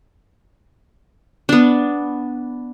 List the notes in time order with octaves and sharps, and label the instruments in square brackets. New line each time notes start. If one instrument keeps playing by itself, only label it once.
[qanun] B3 D4